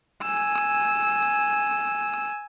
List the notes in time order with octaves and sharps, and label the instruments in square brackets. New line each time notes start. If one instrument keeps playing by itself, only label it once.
[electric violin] G#5 E6